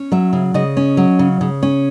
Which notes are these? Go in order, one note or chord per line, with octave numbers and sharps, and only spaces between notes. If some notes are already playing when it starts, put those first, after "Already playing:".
Already playing: C#4
F#3 E5
C#3
C#3 D#5
C#4
F#3
C#3
C#3
C#4